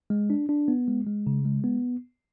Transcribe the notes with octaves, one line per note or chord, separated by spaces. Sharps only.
G#3
D4
D4
B3
G#3
G#3
C#3
G#3
B3